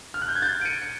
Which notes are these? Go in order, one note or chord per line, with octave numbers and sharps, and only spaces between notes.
F6
F#6
G6
G#6
G6 A6
D7
C#7 D#7
C#7